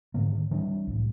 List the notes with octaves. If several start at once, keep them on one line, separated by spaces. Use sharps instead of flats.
G#2 D3 D#3 A#3
E3 G3 C4 D4
C2 A2